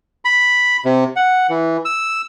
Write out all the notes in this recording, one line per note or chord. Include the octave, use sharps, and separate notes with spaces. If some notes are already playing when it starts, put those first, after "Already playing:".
B5
C3
F#5
E3
E6